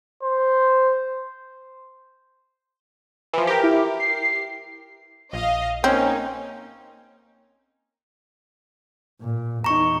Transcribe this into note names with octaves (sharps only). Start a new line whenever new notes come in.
C5
E3 F3
G4 A#4
E4
C7
A#1 D#5 F5
A#3 C4 C#4 D#4
A#2
E2 D#4 A#5 C#6